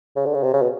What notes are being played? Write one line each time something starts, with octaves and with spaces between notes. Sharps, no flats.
C#3
D3
C#3
C3
C#3
B2